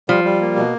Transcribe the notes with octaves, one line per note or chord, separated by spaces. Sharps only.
F3 G3
G3
A#3
B2